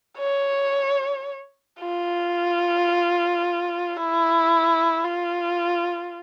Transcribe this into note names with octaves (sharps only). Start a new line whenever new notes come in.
C#5
F4
E4
F4